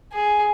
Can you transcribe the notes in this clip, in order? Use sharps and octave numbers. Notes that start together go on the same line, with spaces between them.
G#4